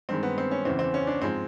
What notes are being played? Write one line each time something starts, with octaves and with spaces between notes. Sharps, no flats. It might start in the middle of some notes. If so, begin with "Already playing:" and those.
G2 D#3 G#3 C4
B3
C4
C#4
E2 C#3 E3 C4
C4
C#4
D4
G#2 F3 G#3 C4